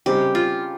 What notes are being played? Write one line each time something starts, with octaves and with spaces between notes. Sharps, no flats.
C#3 G3 C4 D#4 G4
F4